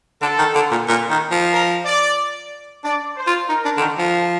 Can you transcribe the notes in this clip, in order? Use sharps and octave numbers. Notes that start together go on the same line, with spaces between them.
D3 A4
D#3
D3
A#2
A#2
D#3
F3
A#4
D5
D4 D5
C5
F4
D#4 A#4
D4
D3
D#3
F3